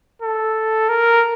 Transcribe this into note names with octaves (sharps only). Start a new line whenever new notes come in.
A4
A#4